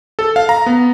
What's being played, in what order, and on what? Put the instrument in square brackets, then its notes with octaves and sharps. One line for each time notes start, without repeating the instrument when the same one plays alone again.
[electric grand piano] A4
F5
A#5
B3